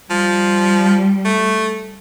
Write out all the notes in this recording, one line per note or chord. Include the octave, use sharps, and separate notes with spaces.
F3 G3
A3